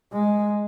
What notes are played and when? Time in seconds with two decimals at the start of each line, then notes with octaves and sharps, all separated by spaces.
0.12 G#3